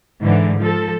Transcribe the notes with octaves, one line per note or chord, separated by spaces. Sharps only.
G#2 D3 E3
F3 A4